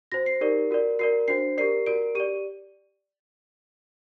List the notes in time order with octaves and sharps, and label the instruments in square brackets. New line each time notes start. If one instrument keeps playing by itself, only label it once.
[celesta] F#4 C5 A#6
C7
D#4 G4 A#4 D5
F#4 A#4 D5
F#4 A#4 D5 C7
D4 F#4 C5 C7
G4 A#4 D5 C7
F#4 A#4 D5 D7
G4 D5 D#7